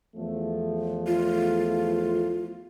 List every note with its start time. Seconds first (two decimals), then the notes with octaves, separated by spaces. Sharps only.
0.16 E2 F3 A3
1.07 F4